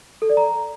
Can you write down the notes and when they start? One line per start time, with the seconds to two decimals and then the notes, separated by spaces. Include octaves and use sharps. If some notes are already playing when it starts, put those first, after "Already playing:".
0.22 A4
0.29 D5
0.37 A#5